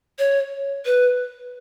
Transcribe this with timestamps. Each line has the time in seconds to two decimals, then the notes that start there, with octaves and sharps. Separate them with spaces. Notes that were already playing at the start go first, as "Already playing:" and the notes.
0.19 C#5
0.86 B4